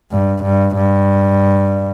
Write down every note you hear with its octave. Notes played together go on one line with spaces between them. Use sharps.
G2
G2
G2